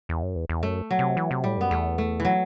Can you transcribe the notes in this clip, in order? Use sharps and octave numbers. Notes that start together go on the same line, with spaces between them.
E2
F#2
E2
E2
F#2 A3
F#3
C3
E3
C3
A2 G3
F#2 B3
E2 A3
A3
E3
F#3